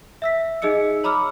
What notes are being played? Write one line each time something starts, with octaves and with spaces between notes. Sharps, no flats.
E5 E6 B6
D#4 G#4 D#5 E6 C#7
C#5 A#5 B5 D6 E6 F6